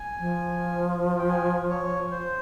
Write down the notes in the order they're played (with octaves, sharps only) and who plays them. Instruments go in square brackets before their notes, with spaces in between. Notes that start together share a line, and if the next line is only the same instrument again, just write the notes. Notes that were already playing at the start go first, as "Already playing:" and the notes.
Already playing: [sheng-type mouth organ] G#5
[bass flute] F3
[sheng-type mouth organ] G5
G#5
C#5
C5